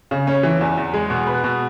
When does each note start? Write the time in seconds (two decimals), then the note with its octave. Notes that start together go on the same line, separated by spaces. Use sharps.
0.11 C#3
0.27 C#4
0.43 E3
0.61 E2
0.77 E2
0.94 G#3
1.10 B2
1.27 B4
1.44 B2